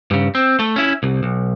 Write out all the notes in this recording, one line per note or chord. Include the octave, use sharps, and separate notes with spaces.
G2 C#3
C4
A3
C#4 E4
C2
B1